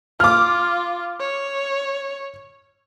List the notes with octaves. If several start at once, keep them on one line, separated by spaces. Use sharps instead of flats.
F4 D6 F6
C#5